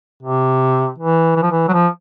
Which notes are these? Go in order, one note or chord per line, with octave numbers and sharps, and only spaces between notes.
C3
E3
E3
F3
E3
F#3
F3